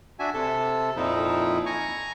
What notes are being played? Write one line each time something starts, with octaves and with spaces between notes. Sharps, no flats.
D4 F#4 E5 G#5
C3 A4
F2 A#2 F3 D#4 E4
G#5 A#5 C#6